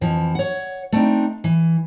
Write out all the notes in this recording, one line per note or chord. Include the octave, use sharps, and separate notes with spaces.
F2 E3 F3
C#5 F#5
A3 C4 D4 D#4
E3